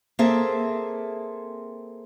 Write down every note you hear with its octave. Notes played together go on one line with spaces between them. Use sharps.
A#3 C4 G#4 A4 E5